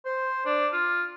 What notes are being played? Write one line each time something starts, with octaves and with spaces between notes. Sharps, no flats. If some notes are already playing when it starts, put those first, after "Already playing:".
C5
D4
F4